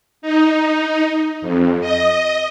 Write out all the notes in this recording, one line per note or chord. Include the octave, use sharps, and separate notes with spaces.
D#4
F2
D#5